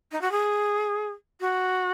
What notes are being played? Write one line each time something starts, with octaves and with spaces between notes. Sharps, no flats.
D#4
F#4
G#4
F#4